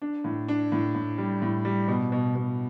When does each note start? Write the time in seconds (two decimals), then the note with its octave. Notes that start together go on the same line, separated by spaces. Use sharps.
0.02 D4
0.24 A2
0.48 D4
0.72 A2
0.94 A2
1.18 G3
1.42 A2
1.65 G3
1.88 B2
2.12 B2
2.35 B2